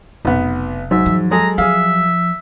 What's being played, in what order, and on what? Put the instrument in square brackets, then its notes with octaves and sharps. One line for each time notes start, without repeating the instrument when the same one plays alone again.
[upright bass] F1 [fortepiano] B1 B3
[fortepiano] G#2 [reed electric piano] F#3 [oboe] E5
[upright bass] E2 F3
[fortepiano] G#3 G#4 A4 [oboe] A#5
[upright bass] F3 [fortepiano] G#4 F5 [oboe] E5